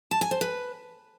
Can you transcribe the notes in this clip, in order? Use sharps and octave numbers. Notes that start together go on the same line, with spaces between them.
A5
G#5
C5
B4